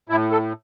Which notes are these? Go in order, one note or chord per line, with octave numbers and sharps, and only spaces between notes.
A2 E4
A4